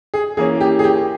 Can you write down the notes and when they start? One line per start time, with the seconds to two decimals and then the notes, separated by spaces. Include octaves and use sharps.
0.14 G#4
0.37 E3 A#3 C#4 G#4
0.61 G4
0.79 G#4
0.84 G4